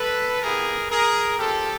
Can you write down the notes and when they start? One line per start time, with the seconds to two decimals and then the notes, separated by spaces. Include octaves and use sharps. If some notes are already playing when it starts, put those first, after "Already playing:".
Already playing: A4 B4
0.42 B3 E4 G4 G#4 A#4
0.90 G#4 A#4
1.39 C4 F4 G4 A4